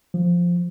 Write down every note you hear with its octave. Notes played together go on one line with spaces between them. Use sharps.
F3